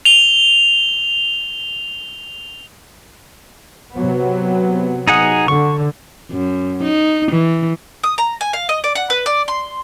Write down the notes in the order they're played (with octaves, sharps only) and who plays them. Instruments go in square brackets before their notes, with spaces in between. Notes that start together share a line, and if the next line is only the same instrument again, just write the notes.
[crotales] F7 G7
[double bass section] C3 F#3 B3
[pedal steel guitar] D#4 G#4 F#5
[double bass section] D3 [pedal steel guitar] C#6
[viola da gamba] F#2
D#4
E3
[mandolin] D#6
A#5
G#5
F5
D#5
D5
F#5
B4
D5
C6